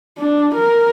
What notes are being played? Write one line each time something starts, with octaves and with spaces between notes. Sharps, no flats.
D4
A#4